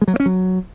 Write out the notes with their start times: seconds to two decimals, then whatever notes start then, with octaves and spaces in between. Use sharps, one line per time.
0.02 G#3
0.08 F#3
0.14 A#3
0.20 C#4
0.26 F#3